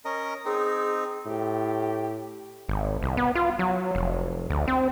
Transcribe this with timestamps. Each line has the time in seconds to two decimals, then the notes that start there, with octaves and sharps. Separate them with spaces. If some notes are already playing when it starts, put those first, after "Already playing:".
0.05 C#4 A#4 D#5
0.46 C4 D#4 G#4
1.26 A2 G4
2.69 G#1
3.03 C2
3.17 B3
3.35 F4
3.59 F#3
3.95 F1
4.50 D2
4.68 C4